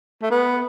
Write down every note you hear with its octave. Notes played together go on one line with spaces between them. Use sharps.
A3
B3